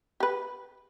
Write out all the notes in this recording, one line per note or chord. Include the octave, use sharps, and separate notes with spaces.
G4 B4